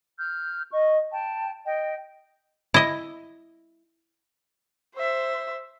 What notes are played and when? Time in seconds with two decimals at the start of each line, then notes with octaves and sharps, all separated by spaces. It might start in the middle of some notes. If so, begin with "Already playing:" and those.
0.17 F6 G6
0.72 D#5 C#6
1.11 G5 A5
1.65 D#5 G5
2.74 E4 D#5
4.96 C5 E5